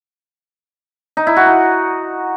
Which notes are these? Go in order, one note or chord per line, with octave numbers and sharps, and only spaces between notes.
D#4
E4
F#4
D#4